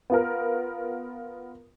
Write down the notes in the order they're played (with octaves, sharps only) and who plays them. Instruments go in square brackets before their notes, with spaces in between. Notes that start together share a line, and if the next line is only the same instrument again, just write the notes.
[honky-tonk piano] B3 F4 A#4